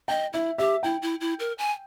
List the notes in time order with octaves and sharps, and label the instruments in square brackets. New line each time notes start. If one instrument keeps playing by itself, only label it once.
[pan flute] D#5 [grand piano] G5
[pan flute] E4 [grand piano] E5
[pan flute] G4 [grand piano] E5
[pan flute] E4 [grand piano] G5
[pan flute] E4
E4
A#4
G#5